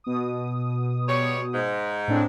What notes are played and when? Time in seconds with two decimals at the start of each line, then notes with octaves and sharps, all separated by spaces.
0.04 B2 D#6
1.08 G3 G#3 C#5
1.54 G#2
2.08 A2 C4 D4